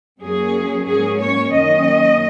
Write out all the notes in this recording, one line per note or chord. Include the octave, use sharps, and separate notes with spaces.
F#2 F#3 A#3 C#4 G#4
G#2 F#3 A#3 C#4 G#4
C#5
F#2 D#3 A#3 C#4 D#5